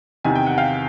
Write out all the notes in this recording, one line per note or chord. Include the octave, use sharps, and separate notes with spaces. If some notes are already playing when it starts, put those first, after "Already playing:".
E2 C3 D#3 G#5
G5
F#5
F5 G5